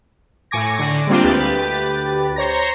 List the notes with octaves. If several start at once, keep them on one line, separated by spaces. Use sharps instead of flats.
A2 G#5 C#6 D6 G#6 A#6
D3 D6
G3 G#3 A#3 C4 D4 F4
D2 G4 B4 A6
C5 C#5 A#5 A#6